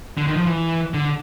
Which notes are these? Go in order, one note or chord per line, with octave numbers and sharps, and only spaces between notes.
D3
D#3
F3
E3
D3